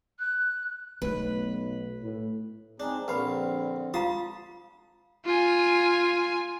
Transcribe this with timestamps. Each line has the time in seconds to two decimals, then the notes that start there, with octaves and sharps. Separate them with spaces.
0.19 F#6
1.02 B1 A3 B3 B4
2.02 A2
2.80 C4 D4 D#4 G#4
3.08 A#1 D3 C4 B4 F5 B5
3.94 F4 F5 A5 A#5 C6 D#6
5.25 F4 G#5